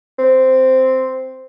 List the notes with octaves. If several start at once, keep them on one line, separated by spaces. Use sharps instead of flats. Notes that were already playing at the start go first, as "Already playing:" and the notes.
C4